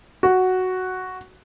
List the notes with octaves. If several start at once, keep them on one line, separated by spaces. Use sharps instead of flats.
F#4